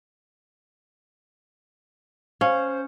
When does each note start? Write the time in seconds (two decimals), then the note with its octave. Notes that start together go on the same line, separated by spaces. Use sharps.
2.41 C#4 C5 F5